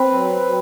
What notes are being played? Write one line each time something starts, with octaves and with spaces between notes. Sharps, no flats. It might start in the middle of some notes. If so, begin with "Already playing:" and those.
Already playing: C4 B4
F#3
F#3